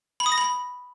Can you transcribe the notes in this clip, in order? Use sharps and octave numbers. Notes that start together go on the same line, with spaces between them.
B5
D#6
A#6
B5